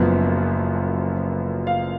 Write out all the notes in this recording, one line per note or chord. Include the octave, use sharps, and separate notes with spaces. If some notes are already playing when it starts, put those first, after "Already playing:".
Already playing: F#1 F#2 F3 B3
F5